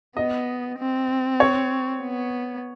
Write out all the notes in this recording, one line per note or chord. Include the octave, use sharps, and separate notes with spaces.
B3 D#5
C4
C#5
B3